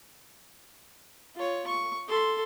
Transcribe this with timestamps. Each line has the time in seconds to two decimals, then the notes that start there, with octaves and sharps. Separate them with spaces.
1.35 F4 C#5
1.67 C#6
2.08 A4 C6